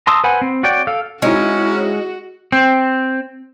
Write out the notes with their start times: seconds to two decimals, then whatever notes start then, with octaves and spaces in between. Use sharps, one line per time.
0.07 A5 A#5 C6 D#6 E6
0.24 B4 C5 F#5 G#5 B5
0.42 C4
0.63 F#4 C#5 D5 G5
0.87 A4 F5
1.22 G#3 C4 C#4 D#4 E4 F#4
2.52 C4